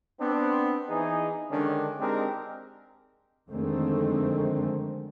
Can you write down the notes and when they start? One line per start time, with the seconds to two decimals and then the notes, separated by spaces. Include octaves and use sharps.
0.19 B3 C4 D4
0.89 E3 D#4 G#4
1.49 D3 D#3 G#3 C#4 D4
2.00 G#3 C4 D4 D#4 G4 A#4
3.49 F2 D3 D#3 G#3 A3 C4